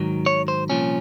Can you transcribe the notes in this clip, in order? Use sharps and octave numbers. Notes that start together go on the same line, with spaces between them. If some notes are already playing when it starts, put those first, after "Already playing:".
Already playing: G#2 D#3 F#3
C#5
C5
C2 A#2 F3 C#4